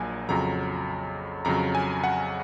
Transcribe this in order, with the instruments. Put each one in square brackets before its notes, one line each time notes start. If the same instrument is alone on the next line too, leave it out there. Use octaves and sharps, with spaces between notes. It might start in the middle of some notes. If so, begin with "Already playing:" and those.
Already playing: [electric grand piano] A#1 A#2 F#3 G#5
F2 C#3 F#3 A#5
F2 C#3 F#3 A#5
G#5
F#5